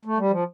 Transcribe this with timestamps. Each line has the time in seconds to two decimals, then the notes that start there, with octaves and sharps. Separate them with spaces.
0.05 A3
0.18 G3
0.31 F3